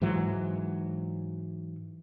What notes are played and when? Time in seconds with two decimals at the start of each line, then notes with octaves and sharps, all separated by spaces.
0.02 G#2 E3 F#3